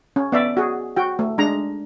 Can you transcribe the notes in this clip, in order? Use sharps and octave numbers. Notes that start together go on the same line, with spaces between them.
C#4
B3 D5 E5
F#4 G#4
F#4 G5
A3
G#3 D4 A#5